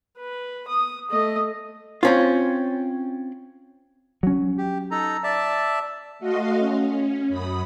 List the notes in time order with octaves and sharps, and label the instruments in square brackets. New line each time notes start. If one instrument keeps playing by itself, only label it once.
[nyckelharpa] B4
D#6
A3 D#5
[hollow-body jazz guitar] C4 C#4 F4
[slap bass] F#3 C#4
[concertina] G4
D#4 A4 A#5
D5 E5 A5
[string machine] A3 F#4 D#5 F5 C6
C#4
F#2 B5 D#6